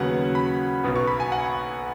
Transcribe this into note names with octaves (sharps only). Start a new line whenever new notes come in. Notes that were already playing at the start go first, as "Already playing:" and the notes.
Already playing: D#2 C#3 F#3 B3 F#5
B5
B1 B2 B3
C#6
B5
G#5
F#5